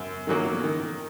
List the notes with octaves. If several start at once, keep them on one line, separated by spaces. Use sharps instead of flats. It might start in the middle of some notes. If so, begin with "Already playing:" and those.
Already playing: F#2
D#3 F#3 A#3 C#4
D#3